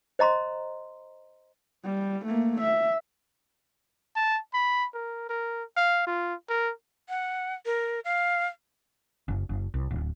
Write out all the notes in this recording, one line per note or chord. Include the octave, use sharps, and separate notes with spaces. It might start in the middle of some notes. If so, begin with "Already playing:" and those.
C5 D#5 A#5 C6
G3
A3 A#3
E5
A5
B5
A#4
A#4
F5
F4
A#4
F#5
A#4
F5
F#1
F#1
C2
D1